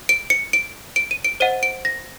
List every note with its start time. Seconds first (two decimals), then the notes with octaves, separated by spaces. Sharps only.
0.09 D7
0.30 C#7
0.53 D7
0.96 D7
1.11 D#7
1.24 D7
1.40 C5 D#5 F#5 D#7
1.63 D7
1.85 A#6